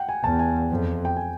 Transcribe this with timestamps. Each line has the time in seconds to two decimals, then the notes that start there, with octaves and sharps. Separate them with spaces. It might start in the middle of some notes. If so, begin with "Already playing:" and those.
Already playing: F#5 G5
0.09 G#5
0.23 E2 A5
0.39 G#5
0.70 F2
1.05 G5
1.17 G#5